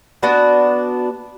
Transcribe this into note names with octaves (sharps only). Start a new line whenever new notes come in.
B3 D4 F#4 D5